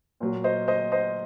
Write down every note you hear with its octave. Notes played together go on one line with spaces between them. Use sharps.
A#2 F#3
C5 D#5
C5 D#5
C5 D#5